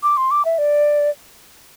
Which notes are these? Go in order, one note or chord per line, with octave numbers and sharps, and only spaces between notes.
D6
C6
D6
E5
D5